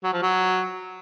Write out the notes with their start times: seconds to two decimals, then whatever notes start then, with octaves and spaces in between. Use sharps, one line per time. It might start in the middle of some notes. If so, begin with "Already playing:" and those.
0.04 F#3
0.13 F3
0.23 F#3